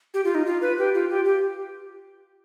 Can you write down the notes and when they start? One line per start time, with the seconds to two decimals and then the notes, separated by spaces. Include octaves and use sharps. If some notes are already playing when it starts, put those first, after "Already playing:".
0.14 G4
0.25 F4
0.35 D#4
0.46 F4
0.62 B4
0.78 G4
0.94 F4
1.10 G4
1.25 G4